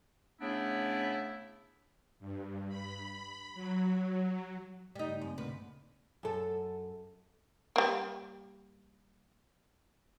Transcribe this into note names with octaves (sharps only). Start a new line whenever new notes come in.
C#3 A3 B3 D4 E4
G2
B5
F#3
F#3
G2 C#3 G3 A3 D#4
F#2 A#3 C4
D2 A#2 C#3 B4
F#2 A4
G3 A#3